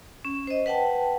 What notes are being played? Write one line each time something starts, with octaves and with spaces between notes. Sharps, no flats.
C#4
C5 D#5
B4 F#5 G5 A5